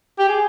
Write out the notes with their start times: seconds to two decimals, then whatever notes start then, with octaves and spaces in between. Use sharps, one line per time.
0.19 G4
0.29 G#4